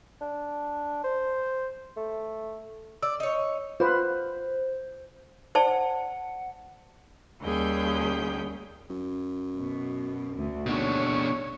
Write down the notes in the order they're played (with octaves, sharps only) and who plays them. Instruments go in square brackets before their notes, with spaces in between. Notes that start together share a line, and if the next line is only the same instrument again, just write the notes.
[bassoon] D4
C5
A3
[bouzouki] D5 [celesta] E6
[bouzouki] D#4 C#5
[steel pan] F4 B4 [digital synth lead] C5
[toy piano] C5 D5 A5 [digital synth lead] F#5
[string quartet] D#2 G3 C#4 G#4 G5 G6
[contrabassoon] F#2
[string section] B2
D2 D3
[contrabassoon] D#2 [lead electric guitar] B2 D4 [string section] C#5
[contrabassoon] A1